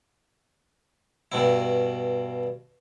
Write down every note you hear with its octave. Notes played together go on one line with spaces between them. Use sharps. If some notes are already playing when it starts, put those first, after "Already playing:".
G2 B2 E4